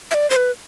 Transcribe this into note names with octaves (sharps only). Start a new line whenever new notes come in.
E5
D5
C5
B4